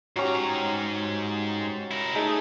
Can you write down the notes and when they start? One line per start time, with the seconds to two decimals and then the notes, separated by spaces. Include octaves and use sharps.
0.16 G#2 F#3 C#4 G4 A#5
1.91 E4 A#4
2.15 A3 D#4 G#4